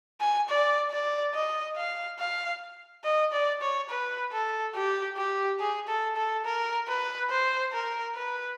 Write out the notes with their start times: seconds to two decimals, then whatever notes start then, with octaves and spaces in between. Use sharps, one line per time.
0.21 G#5
0.48 D5
0.91 D5
1.34 D#5
1.76 F5
2.19 F5
3.04 D#5
3.32 D5
3.61 C#5
3.89 B4
4.32 A4
4.74 G4
5.17 G4
5.60 G#4
5.88 A4
6.16 A4
6.45 A#4
6.88 B4
7.30 C5
7.73 A#4
8.15 B4